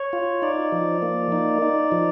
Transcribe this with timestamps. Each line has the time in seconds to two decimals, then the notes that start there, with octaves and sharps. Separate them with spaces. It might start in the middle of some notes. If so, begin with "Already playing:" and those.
Already playing: C#5
0.13 F4
0.42 D#4 D5
0.72 F3
1.02 A#3
1.32 D#4
1.62 D#4
1.92 F3